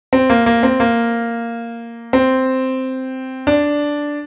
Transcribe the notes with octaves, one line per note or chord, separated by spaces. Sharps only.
C4
A#3
A#3
C4
A#3
C4
D4